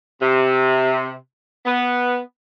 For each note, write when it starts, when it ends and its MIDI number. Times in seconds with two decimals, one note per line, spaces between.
0.22 1.14 48
1.66 2.19 59